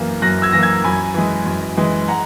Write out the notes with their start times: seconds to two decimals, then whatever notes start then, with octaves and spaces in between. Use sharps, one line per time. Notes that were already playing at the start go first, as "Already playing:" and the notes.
Already playing: F#2 E3 A#3
0.22 F#2 F#6 A#6
0.42 E6 G#6
0.52 E3 A#3 A#6
0.63 E6 G#6
0.84 F#2 G#5 B5
1.14 E3 G#3
1.46 F#2
1.77 E3 G#3
2.08 F#5 A#5